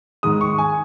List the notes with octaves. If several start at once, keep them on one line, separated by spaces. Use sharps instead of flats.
G#2 D#3 G#3 D#6
C#6
G#5